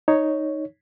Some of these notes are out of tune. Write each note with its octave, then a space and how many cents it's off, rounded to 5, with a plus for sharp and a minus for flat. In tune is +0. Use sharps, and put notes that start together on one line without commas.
D#4 +0 C#5 +0